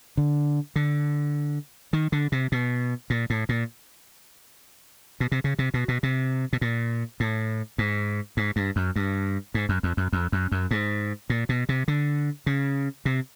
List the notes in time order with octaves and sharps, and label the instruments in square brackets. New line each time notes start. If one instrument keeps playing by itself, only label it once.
[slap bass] D3
D3
D#3
D3
C3
B2
A#2
A2
A#2
B2
C3
C#3
C3
B2
B2
C3
B2
A#2
A2
G#2
G#2
G2
F#2
G2
G#2
F#2
F2
F#2
F2
F#2
F#2
G#2
A#2
B2
C3
D3
C#3
C3